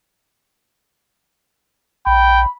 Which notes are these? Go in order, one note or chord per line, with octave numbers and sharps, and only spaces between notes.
A#1 G5 B5